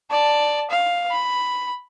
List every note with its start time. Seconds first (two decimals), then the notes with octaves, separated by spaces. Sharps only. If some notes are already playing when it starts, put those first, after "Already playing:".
0.11 D5 A5
0.70 F5
1.12 B5